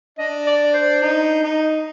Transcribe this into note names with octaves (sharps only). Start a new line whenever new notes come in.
D4 D#5
D5
C5
D#4
D#4